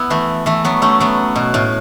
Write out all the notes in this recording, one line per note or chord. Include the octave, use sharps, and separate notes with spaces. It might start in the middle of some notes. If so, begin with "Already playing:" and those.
Already playing: B3 E4
E3 A3
E3 A3
F#3 B3
A3 C#4
F#3 B3
B2
A2